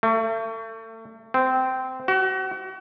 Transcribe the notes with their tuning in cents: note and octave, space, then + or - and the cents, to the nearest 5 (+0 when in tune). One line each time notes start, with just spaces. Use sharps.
A3 +35
C4 -15
F#4 +35